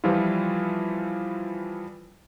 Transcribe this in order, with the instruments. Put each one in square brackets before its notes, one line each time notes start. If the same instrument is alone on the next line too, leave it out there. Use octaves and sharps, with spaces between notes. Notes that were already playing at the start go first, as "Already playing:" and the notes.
[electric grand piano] E3 F3 G3 E4 F4